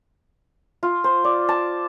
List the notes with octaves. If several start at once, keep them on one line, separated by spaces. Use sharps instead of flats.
F4
C5
D5
A5